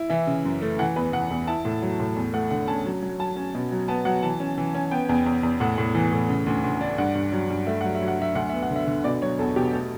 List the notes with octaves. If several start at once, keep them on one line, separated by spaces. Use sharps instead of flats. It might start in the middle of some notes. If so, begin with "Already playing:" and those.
Already playing: E4
E3 E5
C#3
F#2
A3
E3 F#5
E2 B4
E3 F#5
E2
E4 A5
A2
F#3
A2
E2
A3 F#5
D3 F#5
C#4 A5
F#3
F#3
F#3 A5
C#4
B2
F#3
B3 A5
F#3 F#5
E3 A5
C#4
E3
C#4
B3 G5
E2
E2
E2
A2 F#5
A2
E3
A2
C#3
D2
D2
D4
G2 F#5
G2
F#3
G2
A3 E5
F#3 F#5
E5
F#3
F#5
F#3 E5
D2 F#5
B3 E5
F#5
D3
E5
D3
B2 D5
F#3 C#5
E2 A4
B2 G4
A3 A4